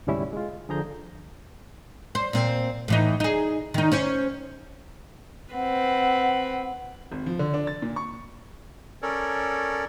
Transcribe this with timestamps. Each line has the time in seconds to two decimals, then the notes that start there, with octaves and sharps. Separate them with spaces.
0.07 D2 G#2 C3 G3 C#4 E4
0.33 G#3 F4
0.69 D3 F3 G#4 A#5 G6
2.15 C5
2.33 A#2 C4
2.88 A2 E3 D#4
3.20 D#4 G#4
3.74 D#3 D#4
3.92 C#4 C5 C#5
5.54 C4 B4 F#5
7.12 G#1
7.26 F3
7.39 D3
7.54 D4
7.67 A6
7.82 A#2
7.96 C#6
9.02 C#4 A4 A#4 C#5 D5